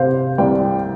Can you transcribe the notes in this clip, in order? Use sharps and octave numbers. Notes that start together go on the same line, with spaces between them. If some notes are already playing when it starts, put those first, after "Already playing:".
Already playing: C3 C5 F5
C2 D5 G5